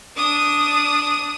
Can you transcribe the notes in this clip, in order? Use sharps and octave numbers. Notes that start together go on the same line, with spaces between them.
D4 D#6